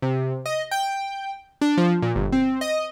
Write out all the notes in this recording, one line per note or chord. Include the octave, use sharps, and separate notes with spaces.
C3
D#5
G5
D4
F3
A#2
G1
C4
D#5